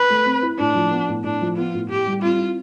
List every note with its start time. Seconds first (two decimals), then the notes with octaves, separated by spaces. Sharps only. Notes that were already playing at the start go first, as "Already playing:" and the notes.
Already playing: B4
0.10 A3
0.25 C4
0.43 E4
0.58 A2 D4
0.75 F3
0.91 B3
1.08 A2
1.24 A2 D4
1.41 F3
1.57 B3 F4
1.74 A2
1.89 A2 G4
2.06 G3
2.23 C4 F4
2.39 E4